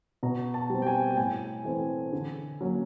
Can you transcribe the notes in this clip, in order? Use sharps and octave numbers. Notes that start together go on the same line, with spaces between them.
B2 A#5
A5
G3 C4
G5
G#5
G5
A2 G#5
E3 A3 C4
D3
F#3 A#3 C#4